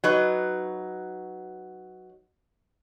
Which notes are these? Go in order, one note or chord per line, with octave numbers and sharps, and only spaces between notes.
F#3 D#4 B4